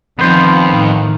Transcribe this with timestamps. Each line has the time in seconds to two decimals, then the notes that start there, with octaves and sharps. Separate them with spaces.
0.19 F2 D#3 F3 B3 C5
0.67 A2 D#3